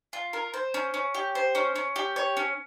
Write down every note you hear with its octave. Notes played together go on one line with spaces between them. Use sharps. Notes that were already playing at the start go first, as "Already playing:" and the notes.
F4
A#4
C5
C#4
C#4
G4
C5
C#4
C#4
G4
C#5
C#4